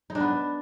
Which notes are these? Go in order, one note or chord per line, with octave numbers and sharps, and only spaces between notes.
D#4
D4
B3